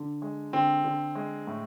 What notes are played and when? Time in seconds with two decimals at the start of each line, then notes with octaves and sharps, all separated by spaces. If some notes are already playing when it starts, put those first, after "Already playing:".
Already playing: D3
0.22 G#3
0.53 D3 C4
0.84 D3
1.15 G#3
1.47 A2